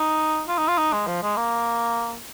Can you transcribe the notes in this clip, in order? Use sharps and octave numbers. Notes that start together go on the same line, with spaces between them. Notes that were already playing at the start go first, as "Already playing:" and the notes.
Already playing: D#4
F4
D#4
F4
D#4
G#3
F3
G#3
A#3